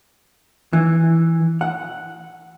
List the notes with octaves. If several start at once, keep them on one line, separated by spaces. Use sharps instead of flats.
E3
F#5